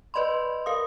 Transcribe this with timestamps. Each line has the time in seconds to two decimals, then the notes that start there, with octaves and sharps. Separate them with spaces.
0.14 B4 D5 D#5 B5 C6
0.66 A#4 F5 D#6